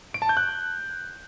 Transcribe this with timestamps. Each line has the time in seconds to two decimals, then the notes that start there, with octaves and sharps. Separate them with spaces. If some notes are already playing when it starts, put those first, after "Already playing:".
0.14 D7
0.22 A5
0.29 G6
0.37 F#6